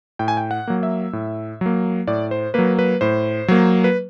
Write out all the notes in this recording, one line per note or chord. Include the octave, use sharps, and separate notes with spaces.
A2 G5
G#5
G5
F#5
F#3 A#3
E5
A2
F#3 A#3
A2 D5
C5
F#3 A#3 B4
B4
A2 C5
F#3 A#3
B4